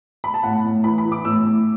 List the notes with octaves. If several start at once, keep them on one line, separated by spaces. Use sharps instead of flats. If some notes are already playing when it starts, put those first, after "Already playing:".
B5
A5
A2 F#5
A2
E3 B5
B5
E3
D6
A2 E6
A2